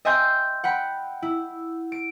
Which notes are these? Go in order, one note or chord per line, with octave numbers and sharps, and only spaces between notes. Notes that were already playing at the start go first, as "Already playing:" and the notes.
D#5 E5 G5 G#5 C6 G6
F#5 G5 B5
E4
D7